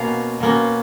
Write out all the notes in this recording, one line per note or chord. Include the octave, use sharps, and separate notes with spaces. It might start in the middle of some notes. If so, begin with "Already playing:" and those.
Already playing: B2 A#3 C#4 F5
B2 A#3 C#4